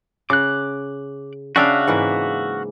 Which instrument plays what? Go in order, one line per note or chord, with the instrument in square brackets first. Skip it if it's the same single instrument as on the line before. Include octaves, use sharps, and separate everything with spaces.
[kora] C#3 [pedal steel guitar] D6 F#6
[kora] C#3 D4 G5 [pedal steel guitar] F#4 E5 F5
[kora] G#2 E3 A#3